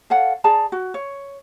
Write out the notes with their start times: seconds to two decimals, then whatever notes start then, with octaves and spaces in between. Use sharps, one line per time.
0.10 A4 C#5 F5 F#5
0.44 G#4 D5 A5 A#5
0.72 F#4
0.94 C#5